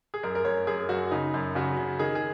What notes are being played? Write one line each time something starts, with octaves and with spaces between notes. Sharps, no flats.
G#4
F#2 A#4
A#4
F#2 C#5
F#2 G#4
F#2 F#4
C#3 D#4
F#2
C#3 F#4
C#3
D#3 G#4
G#4